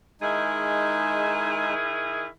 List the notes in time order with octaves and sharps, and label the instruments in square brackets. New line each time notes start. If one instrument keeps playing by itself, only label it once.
[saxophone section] D#3 E4 G#4 [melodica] G#3 D#4